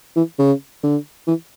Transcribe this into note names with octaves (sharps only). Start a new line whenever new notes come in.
E3
C#3
D3
E3